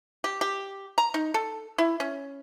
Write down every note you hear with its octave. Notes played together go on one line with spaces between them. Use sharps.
G4
G4
A#5
D#4
A4
E4
C#4